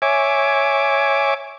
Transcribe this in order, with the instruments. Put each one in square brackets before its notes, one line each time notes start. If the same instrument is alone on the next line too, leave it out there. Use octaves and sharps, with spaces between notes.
[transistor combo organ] C#5 E5 G#5 D6